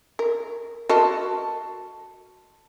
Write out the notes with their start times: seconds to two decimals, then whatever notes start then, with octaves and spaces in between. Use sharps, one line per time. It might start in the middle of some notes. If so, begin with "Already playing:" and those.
0.19 A#4
0.89 F#4 A4 A#4 D#5 C6